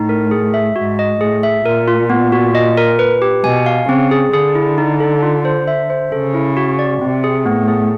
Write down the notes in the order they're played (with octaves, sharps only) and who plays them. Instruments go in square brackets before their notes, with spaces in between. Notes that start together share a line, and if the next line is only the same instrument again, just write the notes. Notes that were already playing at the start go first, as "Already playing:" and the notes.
Already playing: [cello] A2 [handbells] D#4
[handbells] A#4
G#4
E5
[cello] G#2 [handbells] F#4
[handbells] D#5
[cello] A2 [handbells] G#4
[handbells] E5
[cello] A#2 [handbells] A#4
[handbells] F4
B3
F#4
D#5
A#4
B4
G4
[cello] B2 [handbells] G#5
[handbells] F5
[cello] C#3 [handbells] C4
[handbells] G#4
[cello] D3 [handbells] G#4
[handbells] E4
D#4
A4
F4
C5
E5
C5
[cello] C#3 [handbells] A4
[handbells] E4
F#4
D5
[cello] C3 [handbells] C4
[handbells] G#4
[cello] A2 [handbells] B3
[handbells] G#4